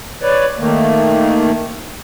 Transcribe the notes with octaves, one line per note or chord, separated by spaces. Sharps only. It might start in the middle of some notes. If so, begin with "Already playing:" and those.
B4 C#5 D5
D#3 A3 A#3